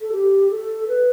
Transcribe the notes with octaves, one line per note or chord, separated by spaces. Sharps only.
A4
G4
A4
B4